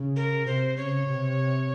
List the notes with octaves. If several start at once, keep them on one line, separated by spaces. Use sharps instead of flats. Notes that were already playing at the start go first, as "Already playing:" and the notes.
Already playing: C#3
A#4
C3 C5
C#3 C#5
C3